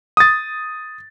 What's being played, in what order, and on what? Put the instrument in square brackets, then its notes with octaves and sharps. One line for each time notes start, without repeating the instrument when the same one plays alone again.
[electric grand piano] D#6 A6